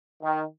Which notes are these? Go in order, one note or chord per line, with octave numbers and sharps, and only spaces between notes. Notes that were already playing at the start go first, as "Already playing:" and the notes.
D#3